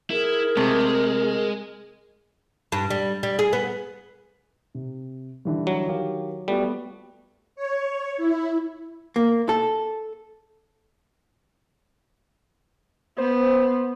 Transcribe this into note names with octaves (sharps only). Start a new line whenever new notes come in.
E4 G#4 A#4
C3 G#3 A3
G2
G3
G3
G#4
B3
C3
D3 E3 G3
F#3
D#3 G4 F5
G3 A3 B3 F#4
C#5
E4
A#3
A4
B3 C5